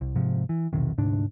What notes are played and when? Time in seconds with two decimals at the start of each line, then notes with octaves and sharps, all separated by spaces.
0.01 C2
0.16 G#2 C3 F3
0.49 E3
0.73 E1 B1 C3 D#3
0.98 D2 G#2 C3 D4